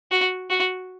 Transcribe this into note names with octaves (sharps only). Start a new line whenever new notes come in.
F#4
F#4